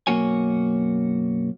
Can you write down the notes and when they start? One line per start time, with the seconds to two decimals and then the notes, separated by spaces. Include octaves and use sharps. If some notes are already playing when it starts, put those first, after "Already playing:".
0.07 B1 F#2 A#3 F#4 C#5 G#5